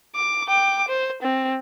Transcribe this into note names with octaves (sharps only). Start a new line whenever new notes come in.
D6
G5 D6
C5
C4